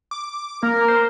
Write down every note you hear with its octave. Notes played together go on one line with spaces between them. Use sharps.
D6
A#3 A#4
C5